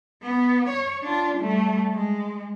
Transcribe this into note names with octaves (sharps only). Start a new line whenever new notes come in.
B3
C#5
D4 F4
G3 A3
G#3